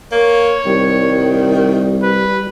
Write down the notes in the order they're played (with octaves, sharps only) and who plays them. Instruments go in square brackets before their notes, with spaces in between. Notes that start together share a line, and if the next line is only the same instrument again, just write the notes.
[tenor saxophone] A#3 [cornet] C#5
[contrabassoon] C2 [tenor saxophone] D#3 [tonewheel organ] G3
[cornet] B4